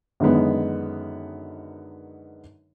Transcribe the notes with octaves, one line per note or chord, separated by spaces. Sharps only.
F#2 D3 D#3 G#3 B3